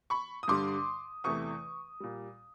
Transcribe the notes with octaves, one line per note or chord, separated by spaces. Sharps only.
B5 C#6
D#6
G2 D3 G3 C6 D6
E2 C3 E3 A3 C#6 D#6
A#2 G3